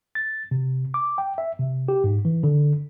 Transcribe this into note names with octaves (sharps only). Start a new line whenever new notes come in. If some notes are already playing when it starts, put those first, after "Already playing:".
A6
C3
D6
G5
E5
C3
G4
G#2
E3
D3